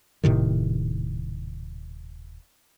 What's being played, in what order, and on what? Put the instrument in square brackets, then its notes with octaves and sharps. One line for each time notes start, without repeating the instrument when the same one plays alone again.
[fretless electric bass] D#1 A2 C3 D#3